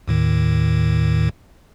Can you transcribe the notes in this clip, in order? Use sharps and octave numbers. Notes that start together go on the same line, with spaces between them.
D#2 A2 D#3